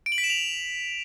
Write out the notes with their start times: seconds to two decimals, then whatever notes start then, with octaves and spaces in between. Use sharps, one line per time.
0.06 D7
0.12 F#7
0.18 B6
0.24 E7
0.30 F7